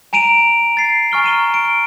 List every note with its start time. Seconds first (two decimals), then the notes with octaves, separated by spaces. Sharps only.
0.13 G#5 A#5 D7 D#7 F7
0.77 A6 C7
1.12 G#5 C#6 F6 G7
1.24 A#5 D#7 G7
1.54 D7